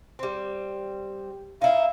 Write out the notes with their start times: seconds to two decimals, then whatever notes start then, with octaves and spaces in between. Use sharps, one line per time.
0.19 G3 C4
1.62 D#4 E4 F5